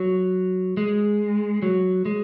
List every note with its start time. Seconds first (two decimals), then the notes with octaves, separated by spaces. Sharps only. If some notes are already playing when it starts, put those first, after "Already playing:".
Already playing: F#3
0.77 G#3
1.62 F#3
2.05 G#3